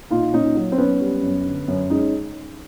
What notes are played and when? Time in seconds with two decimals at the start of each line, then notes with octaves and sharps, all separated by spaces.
0.10 A#2 D#4 F4
0.33 A#2 C#4 D#4
0.56 F#3
0.72 C4
0.78 F#3 B3 C#4
1.01 G3
1.23 F#2
1.46 D3
1.68 F#2
1.90 G#3 C#4 D#4